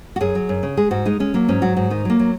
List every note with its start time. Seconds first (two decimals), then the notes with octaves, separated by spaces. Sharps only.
0.16 F#4
0.21 F#2 G#4
0.35 F#3
0.49 F#2
0.63 C#3
0.77 G#3 G#4
0.91 G#2 F#4
1.05 G#3 D#4
1.20 G#3 C#4
1.34 F#3 A#3
1.48 G#2 C#4
1.62 F#3 F#4
1.76 G#2 F#4
1.90 D#3 D#4
2.05 F#3 A#3
2.19 F#3